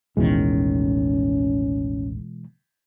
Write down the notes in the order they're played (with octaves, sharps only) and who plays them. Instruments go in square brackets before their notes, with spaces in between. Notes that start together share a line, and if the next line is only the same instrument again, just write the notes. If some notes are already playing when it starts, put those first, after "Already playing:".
[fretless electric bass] A1 D#2 D#3 [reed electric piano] B2 E3 G#3 [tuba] C#4